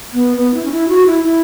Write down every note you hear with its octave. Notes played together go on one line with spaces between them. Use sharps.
B3
B3
E4
C#4
E4
F#4
E4
E4